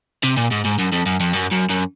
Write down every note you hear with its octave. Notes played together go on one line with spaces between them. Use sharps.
C3
A#2
G#2
G#2
F#2
F2
F#2
F2
F#2
F#2
F#2